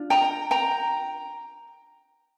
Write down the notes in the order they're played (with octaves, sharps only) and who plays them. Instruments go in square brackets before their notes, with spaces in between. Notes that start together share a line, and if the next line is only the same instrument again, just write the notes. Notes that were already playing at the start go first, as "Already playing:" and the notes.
Already playing: [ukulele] D4 F4
G5 A#5
G5 A#5